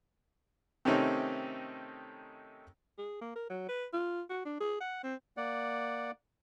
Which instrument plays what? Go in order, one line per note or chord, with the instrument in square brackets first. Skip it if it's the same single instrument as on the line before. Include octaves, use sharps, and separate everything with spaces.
[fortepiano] C3 D#3 A3 C4 C#4 D#4
[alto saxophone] G#4
A#3
A#4
F#3
B4
F4
F#4
D4
G#4
F#5
C4
[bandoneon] A#3 D5 F#5